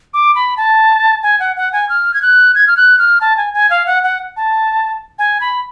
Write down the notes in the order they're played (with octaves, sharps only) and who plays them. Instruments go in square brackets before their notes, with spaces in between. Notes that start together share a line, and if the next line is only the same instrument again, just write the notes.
[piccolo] D6
B5
A5
G#5
F#5
F#5
G#5
F6
G#6
F#6
G#6
F6
F#6
F6
A5
G#5
G#5
F5
F#5
F#5
A5
G#5
B5